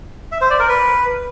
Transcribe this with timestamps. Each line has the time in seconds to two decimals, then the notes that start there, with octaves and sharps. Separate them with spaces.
0.32 E5
0.41 C5
0.50 D5
0.60 A#4
0.69 B4